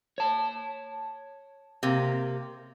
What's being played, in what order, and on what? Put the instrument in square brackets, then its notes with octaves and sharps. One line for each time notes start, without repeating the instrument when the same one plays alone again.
[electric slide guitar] C#5 A5
[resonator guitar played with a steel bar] C3 A#3